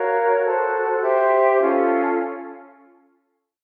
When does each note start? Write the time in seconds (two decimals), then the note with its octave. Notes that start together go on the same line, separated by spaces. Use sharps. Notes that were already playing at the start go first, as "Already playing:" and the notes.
Already playing: F#4 A#4 C#5 F5
0.43 F#4 A4 C5
1.01 G4 C5 E5
1.60 C#4 F4 A4